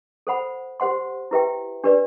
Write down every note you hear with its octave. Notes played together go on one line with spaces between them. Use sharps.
A4 C5 F#5 B5
G4 C5 F#5 C6
E4 G4 B4 E5 G5
D4 G4 B4 D5